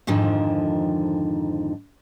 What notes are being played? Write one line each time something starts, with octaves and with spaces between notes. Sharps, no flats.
F2 G#2 D3 D#3 F3